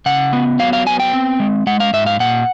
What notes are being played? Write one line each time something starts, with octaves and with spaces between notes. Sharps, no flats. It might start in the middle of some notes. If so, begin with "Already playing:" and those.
C#3 F#5
B3
F#3 F5
F5
B3 G#5
G5
C4
G#3
G#3 F#5
F5
G#2 E5
F5
A#2 F#5